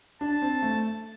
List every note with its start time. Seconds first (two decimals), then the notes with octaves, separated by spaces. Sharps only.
0.21 D4 A5
0.42 C4
0.63 A3